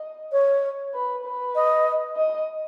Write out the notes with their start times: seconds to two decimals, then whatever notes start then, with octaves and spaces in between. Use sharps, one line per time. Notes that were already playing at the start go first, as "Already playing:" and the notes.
Already playing: D#5
0.32 C#5
0.94 B4
1.25 B4
1.55 D#5
2.17 D#5